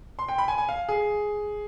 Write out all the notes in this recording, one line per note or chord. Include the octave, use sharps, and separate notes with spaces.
C6
G5
B5
G#5
G#5
F5
G#4